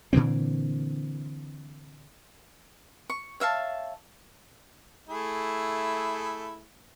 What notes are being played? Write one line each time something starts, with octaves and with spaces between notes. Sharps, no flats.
A#2 D3 E3 C4
C#6
C#5 E5 F5 A5
A3 E4 G#4